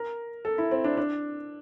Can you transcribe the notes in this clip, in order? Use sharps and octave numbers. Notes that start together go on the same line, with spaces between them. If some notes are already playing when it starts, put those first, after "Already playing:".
Already playing: A#4
A4
E4
C4
D4
D4